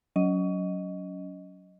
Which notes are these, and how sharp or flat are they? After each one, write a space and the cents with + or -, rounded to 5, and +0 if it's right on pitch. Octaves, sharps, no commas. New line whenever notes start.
F#3 +0 C#4 +25 D#5 +0